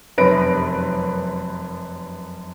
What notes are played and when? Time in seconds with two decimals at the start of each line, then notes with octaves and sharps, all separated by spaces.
0.18 F1 F#2 B4 C#5 A#6 D7